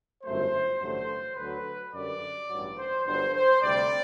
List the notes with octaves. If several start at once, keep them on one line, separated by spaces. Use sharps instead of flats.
G1 F#2 F#3 A3 C5
A1 G2 D3 F#3 A3 C5
D2 D3 F#3 B4
F#2 D3 G3 D5
A1 G2 F#3
C5
G1 G2 D3 F#3 C5
C5
D2 C3 G3 D5